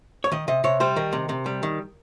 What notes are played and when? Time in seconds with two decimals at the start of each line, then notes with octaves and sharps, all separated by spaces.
0.24 C#5
0.32 D#3 D#5
0.48 C3 D#5
0.64 C3 C#5
0.80 G3 C5
0.96 D#3 A#4
1.13 C3
1.29 C3
1.46 G3
1.63 D#3